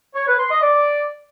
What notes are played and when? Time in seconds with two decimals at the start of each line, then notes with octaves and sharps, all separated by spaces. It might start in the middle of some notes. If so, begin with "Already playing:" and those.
0.15 C#5
0.27 B4
0.39 C6
0.50 D#5
0.62 D5